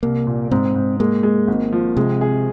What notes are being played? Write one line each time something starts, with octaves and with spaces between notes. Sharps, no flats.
C2 A#3
A#2
G#2 C4
G#2
G#3 A#3
G#3
G#1
F3
C3 G#3
G#4